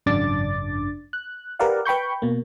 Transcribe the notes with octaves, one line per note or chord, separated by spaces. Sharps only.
G#1 F#2 C#3 D4 D6 A6
F#6
G4 A#4 B4 D5 F5 F#5
B4 G5 B5 C#6 G6
B2 A#3